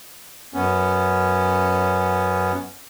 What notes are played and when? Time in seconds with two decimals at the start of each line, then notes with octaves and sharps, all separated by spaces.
0.54 F#2 B3 C#4